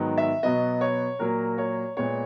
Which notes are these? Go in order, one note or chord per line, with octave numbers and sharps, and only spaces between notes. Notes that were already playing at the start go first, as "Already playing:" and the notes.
Already playing: G#2 D#3 F#3 B3
E5
B2 F#3 B3 D#5
C#5
A#2 F#3 A#3 A#4
C#5
A#2 G#3 B3 C#5